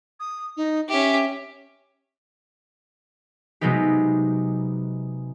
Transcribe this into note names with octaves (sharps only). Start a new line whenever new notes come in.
D#6
D#4
C#4 G4 E5
C3 F#3 G#3 B3 D#4 G4